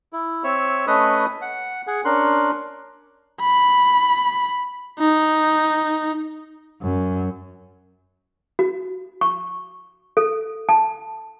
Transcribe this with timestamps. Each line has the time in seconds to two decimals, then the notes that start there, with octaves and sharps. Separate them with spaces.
0.13 E4
0.44 C4 C#5 E5
0.87 A3 C#4 B4 D#5 B5 D#6
1.42 F#5
1.87 G#4 F#5
2.05 C#4 D4 A#4 C6 F#6
3.41 B5
4.99 D#4
6.82 F#2
8.59 F#4
9.21 C#6
10.17 A4
10.69 A5